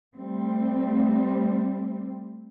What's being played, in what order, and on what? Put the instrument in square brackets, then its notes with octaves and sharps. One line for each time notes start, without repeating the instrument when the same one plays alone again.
[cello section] G3 A3 C4